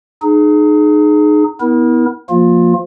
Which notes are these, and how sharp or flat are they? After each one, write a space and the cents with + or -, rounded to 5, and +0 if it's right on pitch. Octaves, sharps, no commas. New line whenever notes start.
D#4 -30 G#4 +25
B3 +0 E4 -30 A#4 +25
F3 +0 A#3 +0 F4 +25